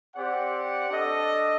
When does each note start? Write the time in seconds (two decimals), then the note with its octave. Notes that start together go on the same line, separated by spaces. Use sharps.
0.15 C4 G4 D5 F#5
0.90 D4 A4 D#5